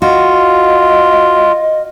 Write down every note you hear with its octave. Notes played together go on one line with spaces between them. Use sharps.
F4 F#4 D#5